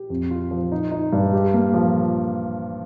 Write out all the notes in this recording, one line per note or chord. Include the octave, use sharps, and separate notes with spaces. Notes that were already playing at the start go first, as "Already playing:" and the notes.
Already playing: G4
F2
F4
F3
D#4
D#4
G2
G4
A#3
F3